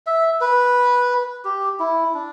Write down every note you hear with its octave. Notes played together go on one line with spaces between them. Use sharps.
E5
B4
G4
E4
D4